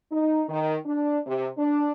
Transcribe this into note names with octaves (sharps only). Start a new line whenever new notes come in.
D#4
D#3
D4
C3
D4